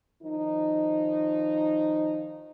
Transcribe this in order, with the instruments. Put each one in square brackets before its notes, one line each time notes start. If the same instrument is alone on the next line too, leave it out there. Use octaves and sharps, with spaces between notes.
[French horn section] D#3 F3 D#4